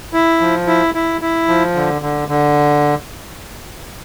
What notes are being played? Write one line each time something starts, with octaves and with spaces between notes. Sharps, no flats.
E4
F3
E4
E4
E4
F3
D3
D3
D3